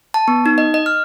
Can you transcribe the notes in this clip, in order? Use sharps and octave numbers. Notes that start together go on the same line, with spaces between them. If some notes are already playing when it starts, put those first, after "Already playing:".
A5
B3
D#4
D#5
D#5
F6